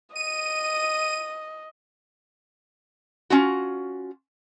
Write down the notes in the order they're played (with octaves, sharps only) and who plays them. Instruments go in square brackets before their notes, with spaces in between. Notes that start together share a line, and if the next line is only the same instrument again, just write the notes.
[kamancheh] D#5 [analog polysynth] D#7
[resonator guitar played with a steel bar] C#4 F4 F#4